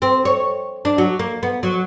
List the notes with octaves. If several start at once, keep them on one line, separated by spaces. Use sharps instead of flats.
C4
C#5
D4
F#3
A#3
B3
F#3